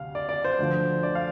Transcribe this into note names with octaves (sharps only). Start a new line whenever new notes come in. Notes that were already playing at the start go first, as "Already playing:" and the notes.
Already playing: D2 C3 F5
D5
D5
C5
D2 D3 F3
D5
F5